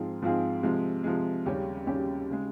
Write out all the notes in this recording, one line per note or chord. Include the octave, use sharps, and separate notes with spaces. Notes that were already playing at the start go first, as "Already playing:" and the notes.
Already playing: G#2 F3 C4 F4 G#4
G#2 F3 C4 F4 G#4
C3 F3 G#3
C3 F3 G#3
D#2 C#3 G3 C#4 G4
D#2 C#3 G3 C#4 G4
C#3 G#3